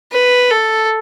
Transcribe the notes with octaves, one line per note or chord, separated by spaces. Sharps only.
B4
A4